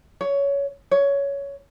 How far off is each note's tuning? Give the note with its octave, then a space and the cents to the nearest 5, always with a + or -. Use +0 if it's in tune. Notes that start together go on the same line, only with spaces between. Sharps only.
C#5 +15
C#5 +15